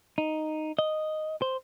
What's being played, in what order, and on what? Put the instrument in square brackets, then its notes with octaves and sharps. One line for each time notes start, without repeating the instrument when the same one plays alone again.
[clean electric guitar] D#4
D#5
C5